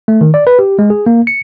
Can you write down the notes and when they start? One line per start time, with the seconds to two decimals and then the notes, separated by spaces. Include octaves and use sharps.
0.08 A3
0.21 D#3
0.34 D5
0.47 B4
0.59 G4
0.79 G#3
0.90 G#4
1.06 A#3
1.27 C#7